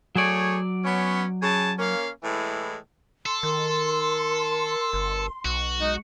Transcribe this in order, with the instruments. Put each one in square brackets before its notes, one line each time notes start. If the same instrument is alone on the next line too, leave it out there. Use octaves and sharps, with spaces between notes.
[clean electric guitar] F#3 D5 [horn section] A3 G#4 C#5
[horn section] B3 C#4
C#3 G#5 A5
A#3 C#4 F5
A2 E3 G#3
[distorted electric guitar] A4 [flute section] C6
[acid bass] D#3 [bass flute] A#4
[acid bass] G1
[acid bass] B1 [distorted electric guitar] F#4
[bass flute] G#3 [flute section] D#4 D#5